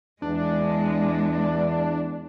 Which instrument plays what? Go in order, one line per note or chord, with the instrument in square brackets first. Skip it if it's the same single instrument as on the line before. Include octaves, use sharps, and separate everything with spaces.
[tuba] E2 [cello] G#3 [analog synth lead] D4